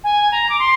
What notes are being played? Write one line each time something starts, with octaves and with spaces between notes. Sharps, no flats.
G#5
A#5
D6
C6